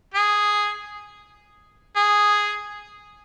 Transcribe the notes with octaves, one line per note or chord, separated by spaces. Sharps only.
G#4
G#4